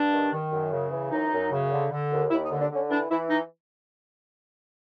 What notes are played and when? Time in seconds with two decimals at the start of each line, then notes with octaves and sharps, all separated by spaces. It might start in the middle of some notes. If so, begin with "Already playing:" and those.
Already playing: G2 D4
0.13 D#3
0.33 D#3
0.52 F#2
0.73 C#3
0.91 E3
1.11 F#2 D#4
1.32 F#2
1.51 C#3
1.71 D3
1.91 D3
2.11 D#2
2.30 D#2 E4
2.45 D#4
2.51 D3
2.61 D4
2.70 D3
2.76 C#4
2.90 E3 D4
3.10 E3 E4
3.30 D#4